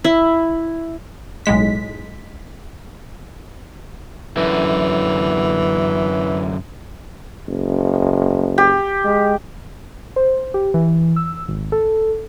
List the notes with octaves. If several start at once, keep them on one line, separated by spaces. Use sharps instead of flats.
E4
B1 A2 G#3 B6
F#2 D3 E3
F#1
G4
G#3
C5
G4
E3
E6
G#1
A4